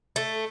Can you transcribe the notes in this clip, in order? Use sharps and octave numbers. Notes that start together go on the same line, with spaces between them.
A3